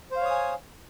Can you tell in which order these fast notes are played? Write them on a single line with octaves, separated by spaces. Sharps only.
C5 F5 C#5 D#6 G#5